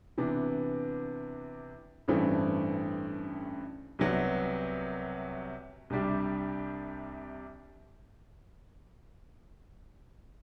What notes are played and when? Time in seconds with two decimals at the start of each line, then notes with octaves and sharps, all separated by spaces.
0.18 C3 E3 B3 D4
2.08 A1 G2 E3 A3 C4
3.99 C2 C3 F#3 B3 F#4
5.90 C2 C3 G3 D4 G4